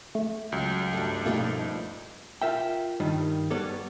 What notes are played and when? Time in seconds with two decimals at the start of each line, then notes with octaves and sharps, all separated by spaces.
0.15 A3
0.52 C#2 F#3
0.93 G2 A3 D4
1.26 B2 F3 G3 A3 A#3 D#4
2.42 F4 A#4 E5 G5
3.00 G2 D#3 G3
3.50 G3 B3 A4 C#5 D5